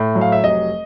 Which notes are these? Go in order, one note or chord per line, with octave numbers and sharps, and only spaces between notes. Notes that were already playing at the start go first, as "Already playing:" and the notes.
Already playing: A2
F#3
F5
E5
F1 D#5